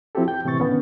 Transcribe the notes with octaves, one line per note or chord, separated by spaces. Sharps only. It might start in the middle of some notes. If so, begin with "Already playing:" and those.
F3 C4 E4 F#4 G4 A4
G5 G6
A2 C3 E3 C4 C#6 A6
D3 D#3 B3 C#4